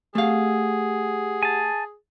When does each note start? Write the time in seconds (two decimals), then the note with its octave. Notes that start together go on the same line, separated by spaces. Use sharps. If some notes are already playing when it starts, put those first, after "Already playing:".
0.15 A3 G4 G#4 F5 F#5
1.43 G#5 A5